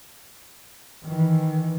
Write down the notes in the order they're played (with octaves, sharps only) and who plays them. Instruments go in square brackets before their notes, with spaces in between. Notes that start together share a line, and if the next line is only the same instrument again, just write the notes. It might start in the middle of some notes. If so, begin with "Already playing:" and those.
[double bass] D#3 E3